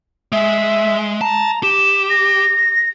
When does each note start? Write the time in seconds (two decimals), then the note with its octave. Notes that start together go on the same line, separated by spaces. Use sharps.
0.32 G#3 E5
1.21 A5 A#5
1.63 G4 E7
2.10 A#6